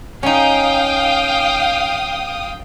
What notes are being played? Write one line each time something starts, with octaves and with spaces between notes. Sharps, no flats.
C#4 D#4 F5 G5 D#6